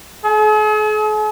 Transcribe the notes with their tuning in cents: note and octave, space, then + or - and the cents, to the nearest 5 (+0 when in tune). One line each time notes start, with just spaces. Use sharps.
G#4 +45